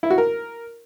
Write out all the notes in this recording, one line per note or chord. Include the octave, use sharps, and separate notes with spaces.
E4
F#4
A#4